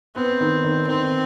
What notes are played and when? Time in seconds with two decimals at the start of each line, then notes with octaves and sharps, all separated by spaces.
0.16 B3 C4
0.40 D#3
0.64 D#3
0.87 D#3 C4